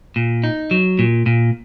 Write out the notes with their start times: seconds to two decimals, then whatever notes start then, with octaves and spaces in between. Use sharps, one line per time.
0.16 A#2
0.44 D#4
0.71 F#3
0.99 A#2
1.26 A#2